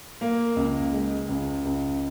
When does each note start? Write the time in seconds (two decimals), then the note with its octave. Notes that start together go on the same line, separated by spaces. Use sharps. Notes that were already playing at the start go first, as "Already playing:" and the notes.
0.21 A#3
0.56 C#2
0.93 G#3
1.29 C#2
1.65 C#2